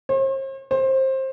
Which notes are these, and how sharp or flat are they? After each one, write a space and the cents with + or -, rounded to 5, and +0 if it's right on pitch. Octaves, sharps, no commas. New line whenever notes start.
C5 +45
C5 +20